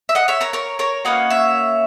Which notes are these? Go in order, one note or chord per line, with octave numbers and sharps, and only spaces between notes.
E5
D#5 F#5
C#5 E5
A#4 C#5
A#4 C#5
A#4 C#5
A#3 C#4 F#4 B4 D#5
C#5 E5